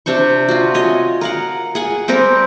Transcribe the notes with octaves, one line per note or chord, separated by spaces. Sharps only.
C3 D4 C5 C#6
F4 F#4
C#5 D#5 G#5
A#4 F5 F#5
G#4 F#5 G#5
G3 C4 G4 A#4